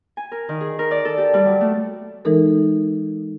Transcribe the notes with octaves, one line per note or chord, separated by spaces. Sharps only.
G#5
A#4
D#3
G#4
A#4
D5
A4
G4
G3
F#3
A3
E3 G#3 D#4 A4 A#4